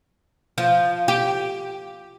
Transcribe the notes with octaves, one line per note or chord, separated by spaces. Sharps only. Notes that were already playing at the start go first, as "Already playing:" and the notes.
F3
G4